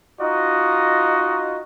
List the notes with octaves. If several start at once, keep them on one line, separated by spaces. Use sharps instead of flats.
D#4 F4 F#4 D#5